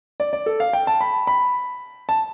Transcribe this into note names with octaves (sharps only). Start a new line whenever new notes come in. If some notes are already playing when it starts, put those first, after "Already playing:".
D5
D5
A4
F5
G5
A5
B5
B5
A5